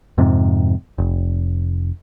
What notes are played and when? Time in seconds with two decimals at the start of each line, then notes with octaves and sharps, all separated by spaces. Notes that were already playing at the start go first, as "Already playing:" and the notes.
0.18 F2 G#2 C3
0.98 F1